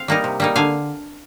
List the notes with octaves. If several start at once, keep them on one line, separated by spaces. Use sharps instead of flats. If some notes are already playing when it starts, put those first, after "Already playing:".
Already playing: C4 F5
G3 A#3 D#4
C3
G3 A#3 D#4
D3 F5 G#5